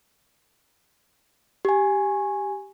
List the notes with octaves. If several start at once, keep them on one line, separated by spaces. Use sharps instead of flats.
G4 G#5